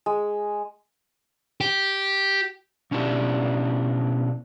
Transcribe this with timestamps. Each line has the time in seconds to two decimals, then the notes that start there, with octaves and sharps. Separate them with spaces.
0.06 G#3
1.61 G4
2.91 B2 C#4 D4 E4 G4